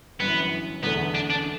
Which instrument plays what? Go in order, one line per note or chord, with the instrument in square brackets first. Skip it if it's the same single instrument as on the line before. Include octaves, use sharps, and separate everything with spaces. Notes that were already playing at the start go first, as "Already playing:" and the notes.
[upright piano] G1 F#2 E3 [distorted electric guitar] B3
[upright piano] F#1 E2 D3 A3 [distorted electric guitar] B3
[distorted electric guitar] D4
D4